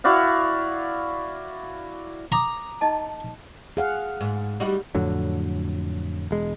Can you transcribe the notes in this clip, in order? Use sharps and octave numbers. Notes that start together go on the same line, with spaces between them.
E4 F#4 D5 F5
A#5 C6 D6 D#6
D#4 D#5 A5
G#4 F5 F#5
G#2
G3 D#4 F#4
F2 A2 D3 F#3
E1 G#3